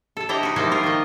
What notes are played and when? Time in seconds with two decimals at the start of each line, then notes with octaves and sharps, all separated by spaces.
0.17 A4 A5
0.29 D4 E4 G4 D#5 G5 A#5
0.43 D#4 F#4
0.56 F3 G3 G#3 A#3 D#4 E4
0.71 F4 A#4
0.84 D#3 D#5